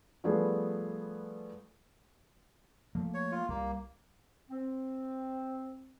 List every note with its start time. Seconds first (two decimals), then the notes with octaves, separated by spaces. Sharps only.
0.24 F3 G3 A3 B3 G#4
2.95 F3 A3 A#3
3.14 C#5
3.32 F4
3.49 C2 G3 A#3
4.50 C4